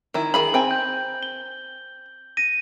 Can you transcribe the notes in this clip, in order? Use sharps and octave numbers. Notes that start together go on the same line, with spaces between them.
D#3 E4
D#3 G#4 B5 F#7
C4 G5 G#5
G6
G7
A#6 D#7